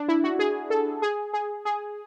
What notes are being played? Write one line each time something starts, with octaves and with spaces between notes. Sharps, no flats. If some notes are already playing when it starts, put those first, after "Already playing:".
Already playing: D4
E4
F#4
G#4
A4
G#4
G#4
G#4